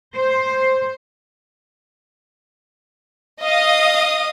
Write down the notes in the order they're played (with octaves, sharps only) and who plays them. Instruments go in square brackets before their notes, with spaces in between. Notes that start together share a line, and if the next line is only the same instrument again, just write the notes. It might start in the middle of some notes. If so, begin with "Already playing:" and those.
[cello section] C5
[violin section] D#5 F5 D#6